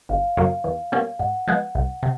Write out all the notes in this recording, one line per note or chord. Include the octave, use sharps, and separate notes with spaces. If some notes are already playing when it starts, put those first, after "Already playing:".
G1 F5
F#2 C#3 F#3 A#3
E2
B2 G3 A#3 C#4
G#2 F#5
F3 G#3 B3
C2
C3